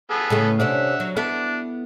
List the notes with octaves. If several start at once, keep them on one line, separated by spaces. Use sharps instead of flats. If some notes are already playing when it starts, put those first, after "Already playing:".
B3 G#4 A4
A2 C#3 A3
C3 C#4 D4 E5 F#5
F#3
B3 D4 E4 A4